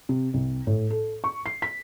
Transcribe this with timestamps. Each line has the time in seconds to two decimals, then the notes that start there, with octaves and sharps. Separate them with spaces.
0.09 C3
0.34 C2
0.67 A2
0.90 A4
1.24 C#6
1.46 C7
1.62 B6